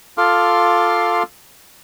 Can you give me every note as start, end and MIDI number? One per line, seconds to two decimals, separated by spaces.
0.18 1.23 65
0.18 1.23 69
0.18 1.23 77
0.18 1.23 84
0.18 1.23 86
0.18 1.23 89